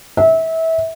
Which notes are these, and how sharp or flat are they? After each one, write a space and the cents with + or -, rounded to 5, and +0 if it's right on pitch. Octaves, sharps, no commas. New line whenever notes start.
E5 -25